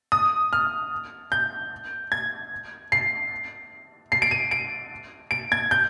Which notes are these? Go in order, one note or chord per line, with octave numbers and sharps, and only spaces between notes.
D#6
F6
G6
G#6
C7
C7
D7
D#7
D7
D7
G#6
G6